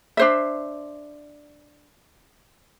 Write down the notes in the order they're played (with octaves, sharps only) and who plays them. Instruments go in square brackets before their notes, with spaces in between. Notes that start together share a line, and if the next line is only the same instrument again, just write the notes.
[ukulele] D4 C5 E5